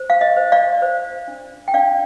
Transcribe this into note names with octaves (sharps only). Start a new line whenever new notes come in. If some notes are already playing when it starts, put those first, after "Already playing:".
Already playing: C5
F5
D#5
C5
D5 F5
C5
D4
G5
D4 D5 F5